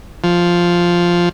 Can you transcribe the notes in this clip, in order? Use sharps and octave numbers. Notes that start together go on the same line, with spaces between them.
F3